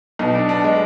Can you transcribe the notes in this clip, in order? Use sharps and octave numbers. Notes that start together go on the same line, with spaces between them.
B1 B2 D#4
D4
D4
G#3